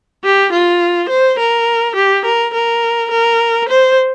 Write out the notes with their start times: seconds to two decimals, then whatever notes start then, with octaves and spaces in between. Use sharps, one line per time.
0.24 G4
0.52 F4
1.09 C5
1.39 A#4
1.96 G4
2.25 A#4
2.54 A#4
3.11 A#4
3.69 C5